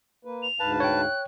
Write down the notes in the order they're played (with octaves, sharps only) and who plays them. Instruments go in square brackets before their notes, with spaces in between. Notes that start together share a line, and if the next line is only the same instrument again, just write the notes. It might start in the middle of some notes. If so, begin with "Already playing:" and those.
[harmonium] A#3 B4
[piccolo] F7
[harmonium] D2 G#2 F5 [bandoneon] B4 A5
[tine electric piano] C#5 G5 [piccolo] F#6